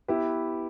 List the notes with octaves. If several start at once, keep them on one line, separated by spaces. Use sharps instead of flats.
B3 E4 G4 B4